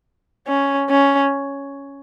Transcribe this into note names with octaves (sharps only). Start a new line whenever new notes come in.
C#4
C#4